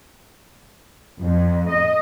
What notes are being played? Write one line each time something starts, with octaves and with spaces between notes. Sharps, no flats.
F2
D#5